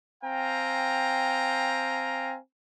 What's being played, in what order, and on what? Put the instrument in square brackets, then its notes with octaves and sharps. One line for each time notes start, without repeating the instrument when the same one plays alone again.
[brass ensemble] C4 F5 G5 G#5 A#5